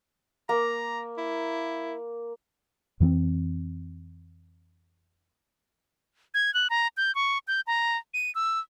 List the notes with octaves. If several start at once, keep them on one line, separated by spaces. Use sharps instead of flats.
A#3 A#5
E4
F2 E3 B3 C4
G#6
F#6
A#5
G6
C#6
G6
A#5
D#7
E6